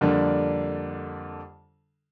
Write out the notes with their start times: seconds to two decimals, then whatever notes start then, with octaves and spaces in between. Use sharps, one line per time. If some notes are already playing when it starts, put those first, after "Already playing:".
0.01 F2 D3 G3 A#3 D4